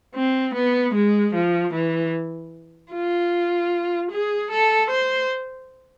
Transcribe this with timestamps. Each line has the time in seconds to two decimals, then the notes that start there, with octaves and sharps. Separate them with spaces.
0.15 C4
0.54 B3
0.94 G#3
1.34 F3
1.74 E3
2.92 F4
4.11 G#4
4.51 A4
4.90 C5